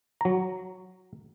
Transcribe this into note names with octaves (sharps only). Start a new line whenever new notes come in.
F#3 A#5